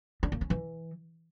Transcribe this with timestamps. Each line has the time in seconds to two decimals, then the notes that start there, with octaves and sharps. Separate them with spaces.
0.23 D4
0.32 A#3
0.41 C#4
0.50 E3